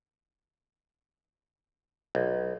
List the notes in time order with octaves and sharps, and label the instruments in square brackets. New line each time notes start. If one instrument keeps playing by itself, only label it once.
[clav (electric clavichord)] B1